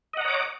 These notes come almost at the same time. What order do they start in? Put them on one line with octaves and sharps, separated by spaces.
D#5 F#5 A#5 C#5 D6